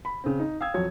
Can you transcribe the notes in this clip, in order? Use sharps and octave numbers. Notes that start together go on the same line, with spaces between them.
B5
C#3 C4
D#4
F5 G5 D#6 E6 G#6
F2 F#3 C#5 G#6